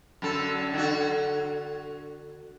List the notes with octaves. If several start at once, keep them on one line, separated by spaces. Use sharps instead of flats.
F#2 D3 A4
D3 F#4